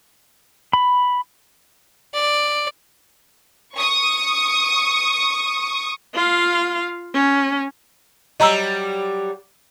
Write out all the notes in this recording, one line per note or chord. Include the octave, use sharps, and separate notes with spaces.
B5
D5
C#6 D#6
F4 F5
C#4
F#3 G3 D#5 A#5 E6